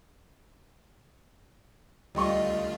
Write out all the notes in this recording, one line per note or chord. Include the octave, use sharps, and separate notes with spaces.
D2 G3 A3 F4 D#5 C#6